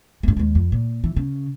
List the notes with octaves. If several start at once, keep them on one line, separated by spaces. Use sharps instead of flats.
G2 A3
D#2 G#3
F2
A#2
E3
C#3